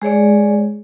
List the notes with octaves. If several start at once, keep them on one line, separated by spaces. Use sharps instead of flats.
G#3 G#4 C#5 D5